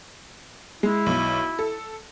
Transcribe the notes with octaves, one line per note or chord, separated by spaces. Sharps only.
G#3 E4
B1
A4